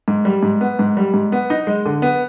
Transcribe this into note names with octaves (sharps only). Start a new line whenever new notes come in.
G#2
G3
G#2
B3
G#2
G3
G#2
B3
D#4
G#3
D3
B3